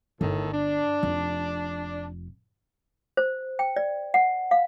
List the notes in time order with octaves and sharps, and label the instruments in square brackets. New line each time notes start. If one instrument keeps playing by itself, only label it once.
[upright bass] G1 [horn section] A2 D#3 A4
[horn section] D4
[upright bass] F1
[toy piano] C5
G5
D5
F#5
F5